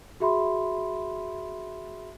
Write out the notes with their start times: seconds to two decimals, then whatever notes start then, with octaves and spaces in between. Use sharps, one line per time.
0.20 F#4 G#4 E5 B5 C6